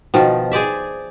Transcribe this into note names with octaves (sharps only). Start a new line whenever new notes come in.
B2 D#3 F3
G#4 C5 D5 E5